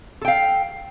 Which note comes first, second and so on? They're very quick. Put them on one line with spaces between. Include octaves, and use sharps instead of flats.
A4 G5 F5